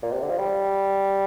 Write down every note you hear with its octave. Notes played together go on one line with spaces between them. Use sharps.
A#2
C3
D3
F3
G3